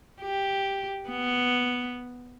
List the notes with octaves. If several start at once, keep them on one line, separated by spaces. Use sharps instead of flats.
G4
B3